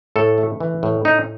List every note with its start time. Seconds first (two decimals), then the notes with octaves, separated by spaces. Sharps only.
0.16 A2 A4
0.38 A3
0.60 E3
0.83 A2
1.05 A2 D#4